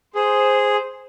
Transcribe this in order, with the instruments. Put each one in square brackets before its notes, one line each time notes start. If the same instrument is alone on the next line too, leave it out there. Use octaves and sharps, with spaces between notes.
[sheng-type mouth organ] G#4 [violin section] C5